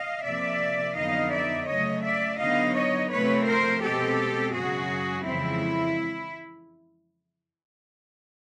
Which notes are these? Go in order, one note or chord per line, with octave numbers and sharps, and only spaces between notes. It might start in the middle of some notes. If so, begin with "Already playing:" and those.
Already playing: D#5 F5
C3 F3 A#3 D5 E5
F2 D3 F#3 B3 D#4 D#5 F5
D5 E5
C#3 F#3 A3 C#5 D#5
D5 E5
D3 F#3 B3 D#4 D#5 F5
C#5 D#5
C3 F3 A3 C4 B4 C#5
A#4 C5
B2 G#3 C4 G4 A4
F#2 C#3 F#3 F#4 G#4
F2 C#3 E3 G#3 C4 E4